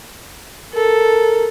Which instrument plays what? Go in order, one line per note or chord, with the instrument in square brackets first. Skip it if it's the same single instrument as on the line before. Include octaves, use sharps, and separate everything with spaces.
[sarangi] A4 [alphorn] A#4